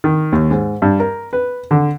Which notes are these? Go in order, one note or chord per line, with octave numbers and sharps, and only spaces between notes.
D#3
D#2
G#2
G2
A#4
B4
D3